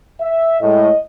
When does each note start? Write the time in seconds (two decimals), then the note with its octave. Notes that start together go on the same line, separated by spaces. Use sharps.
0.21 E5
0.60 A2 G#3 D#5